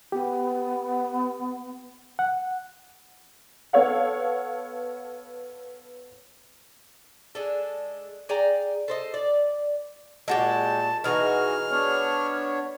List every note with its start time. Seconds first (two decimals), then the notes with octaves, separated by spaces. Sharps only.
0.12 B3 G4
2.19 F#5
3.73 B3 A4 C#5 F5 F#5
7.35 G#3 D4 A4
8.29 G#4 D5 G5 A#5
8.88 A4 C5 D#5
9.14 D5
10.28 A#2 G#3 F#4 G4 A5
11.04 B2 E3 D#4 F#4 G#4 F6
11.71 B3 D4 C#5